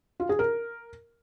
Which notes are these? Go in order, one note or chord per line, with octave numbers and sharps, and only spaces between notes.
F4
G#4
A#4